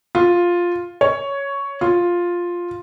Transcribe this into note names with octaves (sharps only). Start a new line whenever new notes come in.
F4
C#5
F4